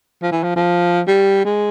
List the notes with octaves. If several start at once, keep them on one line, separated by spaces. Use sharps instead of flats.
F3
E3
F3
F3
G3
G#3